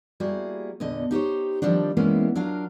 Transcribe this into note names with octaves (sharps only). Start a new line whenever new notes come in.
G3 A#3 E4 F#4 G#4
E2 A#2 D3 D#5
D#4 G4 C5 C#5
D#3 F3 G3 C4 D4
E3 G#3 A#3 B3 C#4 E4
F#3 D4 F4 A#4 F5